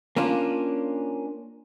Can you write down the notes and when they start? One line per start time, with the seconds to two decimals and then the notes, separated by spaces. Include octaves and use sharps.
0.16 A#3 C#4 D4 F4